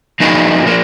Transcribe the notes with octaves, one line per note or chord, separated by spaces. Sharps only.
F3 A#3 D#4 F#4 B4
F3 A#3